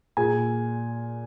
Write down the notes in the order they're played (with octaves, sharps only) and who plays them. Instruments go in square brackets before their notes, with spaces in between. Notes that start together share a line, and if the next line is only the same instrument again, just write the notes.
[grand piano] A#2 G#4 G#5